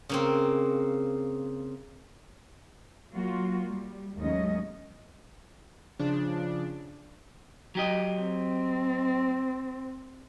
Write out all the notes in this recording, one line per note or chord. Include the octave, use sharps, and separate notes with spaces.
C#3 A#3 C4
F#3 A#3 F4 F#4
G3
D#2 G#2 F#3 A3 C#4 D#5
C#3 F3 D4
F#3 G4 D#5
C4